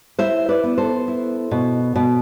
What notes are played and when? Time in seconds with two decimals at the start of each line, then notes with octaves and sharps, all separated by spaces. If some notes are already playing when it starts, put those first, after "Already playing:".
0.19 E4 C5 E5
0.49 B4 D5
0.63 B3
0.78 A4 C5
1.08 E4
1.51 B2
1.96 B2